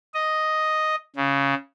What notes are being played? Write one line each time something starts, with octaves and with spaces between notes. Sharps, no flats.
D#5
C#3